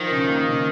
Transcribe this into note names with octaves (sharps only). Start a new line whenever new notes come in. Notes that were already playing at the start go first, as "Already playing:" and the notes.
Already playing: D#3 F3
C#3
A#3
C#3